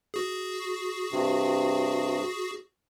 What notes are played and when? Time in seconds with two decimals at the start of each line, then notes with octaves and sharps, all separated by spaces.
0.14 F#4 G#4
1.12 G2 C3